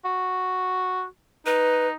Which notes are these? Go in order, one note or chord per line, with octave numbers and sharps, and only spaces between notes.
F#4
D#4 B4